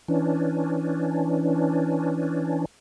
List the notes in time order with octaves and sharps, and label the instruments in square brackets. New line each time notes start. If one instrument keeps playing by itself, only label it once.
[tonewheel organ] E3 C#4 D4